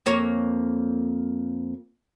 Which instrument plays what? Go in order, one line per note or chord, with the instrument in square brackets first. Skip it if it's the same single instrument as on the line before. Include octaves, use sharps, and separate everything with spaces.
[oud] F2 A#3 C#5